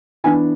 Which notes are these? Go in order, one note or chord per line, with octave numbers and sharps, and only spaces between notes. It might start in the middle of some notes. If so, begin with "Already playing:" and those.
E3 B3 D4 G#5